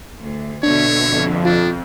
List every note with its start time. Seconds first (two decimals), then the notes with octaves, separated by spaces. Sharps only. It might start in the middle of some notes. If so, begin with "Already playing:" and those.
0.19 D2
0.63 B2 D3 D4 C#5 E5
1.04 F2
1.45 D4 F4